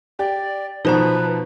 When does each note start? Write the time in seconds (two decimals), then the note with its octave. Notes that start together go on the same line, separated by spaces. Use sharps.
0.19 G4 D5
0.85 B2 F3 D#4 B4 C5 A#5